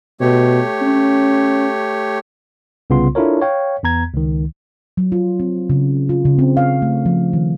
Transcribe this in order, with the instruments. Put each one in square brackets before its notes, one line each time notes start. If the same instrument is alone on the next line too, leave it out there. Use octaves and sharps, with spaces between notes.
[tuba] B2 [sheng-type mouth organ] A3 G4 C#5
[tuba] C#4
[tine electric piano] C2 C#3 B3 F4 C6
D4 E4 F4 A4 A#4 C#5
C#5 F5 G5
E2 B3 A#5 G#6
C#2 D#3
[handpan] F#3
F4
C4
C#3
F4
C#3
C4
F5
A3
F3
D#3